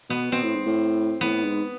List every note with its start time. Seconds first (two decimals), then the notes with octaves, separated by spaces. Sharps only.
0.09 B2 B3
0.32 B2 C4
0.43 A2
0.55 G#2
0.66 A2
1.21 A2 B3
1.44 G#2